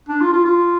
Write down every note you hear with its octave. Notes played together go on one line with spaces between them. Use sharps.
D4
F4
F4
F4